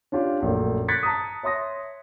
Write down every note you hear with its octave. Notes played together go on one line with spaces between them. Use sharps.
C#4 D4 F4 G4
A#1 F#2 A3
F#6 G#6 A6 B6 C#7
A5 A#5 D#6
C#5 E5 C6 D#6 A#6